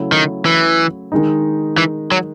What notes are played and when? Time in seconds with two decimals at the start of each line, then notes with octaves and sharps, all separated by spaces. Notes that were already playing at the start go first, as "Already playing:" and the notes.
Already playing: C#3 F#3 A3 E4
0.12 D#3
0.46 E3
1.12 D#3 G#3 D#4
1.78 E3
2.12 F#3